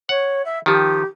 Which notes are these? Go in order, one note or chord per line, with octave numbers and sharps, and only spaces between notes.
C#5 F#5
E5
D#3 F3 G4